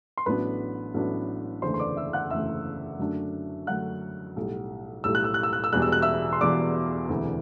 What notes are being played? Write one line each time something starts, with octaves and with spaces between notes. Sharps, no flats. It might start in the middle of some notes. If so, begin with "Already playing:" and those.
C6
A1 A2 F#3 B3 D4 B4 B5
A1 A2 F#3 B3 D4
F#1 E2 D3 A3 C5 C6
C6
D5 D6
E5 E6
F#5 F#6
F#1 E2 D3 A3 E5 E6
F#2 D3 F#3 A3 D4
F#2 D3 F#3 A3 D4 F#5 F#6
B1 A2 G3
B1 A2 G3 E6
F#6
E6
F#6
E6
F#6
E6
E1 E2 B2 G3 F#6
E6
F#6
E5 E6
C6
E1 E2 B2 G3 D5 D6
E1 D2 C3 E3